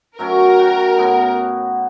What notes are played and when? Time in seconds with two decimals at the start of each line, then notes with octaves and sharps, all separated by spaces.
0.19 F#3 A3 C#4 A#4
0.59 F#4 G5
0.97 A2 B3 A#5